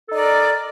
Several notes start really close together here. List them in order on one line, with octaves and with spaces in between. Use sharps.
A4 D#4 D5 A#4